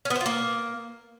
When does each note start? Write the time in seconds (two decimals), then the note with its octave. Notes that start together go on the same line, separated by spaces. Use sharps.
0.05 C#4
0.10 B3
0.15 C5
0.21 F4
0.26 A#3